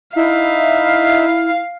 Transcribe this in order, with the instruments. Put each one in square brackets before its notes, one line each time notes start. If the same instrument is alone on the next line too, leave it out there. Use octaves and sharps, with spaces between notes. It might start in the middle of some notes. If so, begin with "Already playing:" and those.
[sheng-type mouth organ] D#4 E5 [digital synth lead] E4 [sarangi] F5